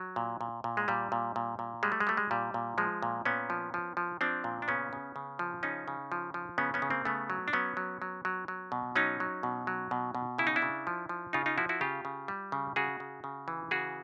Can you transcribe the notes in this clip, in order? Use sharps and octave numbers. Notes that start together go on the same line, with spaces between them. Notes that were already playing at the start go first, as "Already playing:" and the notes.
Already playing: F#3
A#2
A#2
A#2
G#3
A#2 G3
A#2
A#2
A#2
G3 G#3
A3
G#3
G3 A3
G#3
A#2 G3
A#2
F3 G#3
A#2
A#2 B3 C#4
F3
F3
F3
F3 C4 D4
A#2
D4
C#3 B3 C#4
C#3
C#3
F3
C#3 C#4 D#4
C#3
F3
F3
C#3 B3 C#4
B3 C#4
C#3
A#3 C4
C#3 A3 B3
F#3
D4
F#3 B3 C#4
F#3
F#3
F#3
F#3
B2
F#3 C#4 D#4
F#3
B2
F#3
B2
B2
C#3 E4
D#4
D4 E4
C#3
F3
F3
C#3 D#4 F4
D#4 F4
F3 E4 F#4
E4 F#4
C#3 F4 G4
C#3
G3
C#3
C#3 F#4 G#4
C#3
C#3
E3
C#3 F#4 G#4